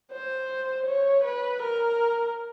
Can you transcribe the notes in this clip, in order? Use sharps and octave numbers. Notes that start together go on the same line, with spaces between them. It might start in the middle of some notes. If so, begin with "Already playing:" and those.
C5
C#5
B4
A#4